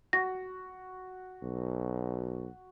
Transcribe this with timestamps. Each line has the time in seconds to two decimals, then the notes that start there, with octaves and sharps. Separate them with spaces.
0.13 F#4 A#6
1.43 B1